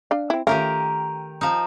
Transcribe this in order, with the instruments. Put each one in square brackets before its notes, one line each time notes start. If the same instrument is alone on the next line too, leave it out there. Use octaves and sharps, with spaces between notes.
[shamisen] D4 F5
C4 E4
[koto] D#3 G4 A#4 [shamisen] A3 C#4 F4
[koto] F3 D#4